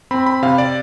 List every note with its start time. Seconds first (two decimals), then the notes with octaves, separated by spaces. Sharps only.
0.11 C4 B5
0.26 B5
0.42 C3 F5
0.58 D5